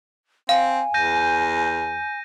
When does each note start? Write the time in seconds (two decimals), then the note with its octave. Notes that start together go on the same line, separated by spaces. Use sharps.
0.49 C4 F5 G#5
0.94 E2 G6 A#6 D#7